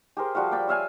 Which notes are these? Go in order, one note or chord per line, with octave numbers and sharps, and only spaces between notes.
G4 G#4 A#4 C5
F3 G3 F#4 F5
D5 G5 B5 D6
C#5 E5 F5 G#5